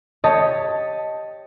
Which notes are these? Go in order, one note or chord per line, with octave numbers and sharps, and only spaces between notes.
G4 C#5 D#5 A5